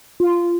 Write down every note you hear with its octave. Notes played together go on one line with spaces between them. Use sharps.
F4